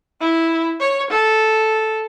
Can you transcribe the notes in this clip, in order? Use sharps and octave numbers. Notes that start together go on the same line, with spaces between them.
E4
C#5
A4